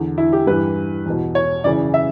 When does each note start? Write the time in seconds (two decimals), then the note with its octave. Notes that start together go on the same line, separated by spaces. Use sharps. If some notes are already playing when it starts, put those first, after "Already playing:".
Already playing: E2 D3
0.18 E4
0.33 G4
0.47 G2 E3 B4
1.06 E2 B2
1.35 C#5
1.64 F#2 C#3 E3 D5
1.94 E5